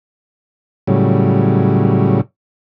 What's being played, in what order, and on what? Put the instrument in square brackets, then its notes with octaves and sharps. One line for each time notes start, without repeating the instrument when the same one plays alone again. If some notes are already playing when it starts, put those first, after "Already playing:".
[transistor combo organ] A2 C#3 F#3 G3